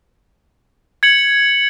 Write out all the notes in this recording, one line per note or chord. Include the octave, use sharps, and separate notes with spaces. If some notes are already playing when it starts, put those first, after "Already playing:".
G#6 C#7 F#7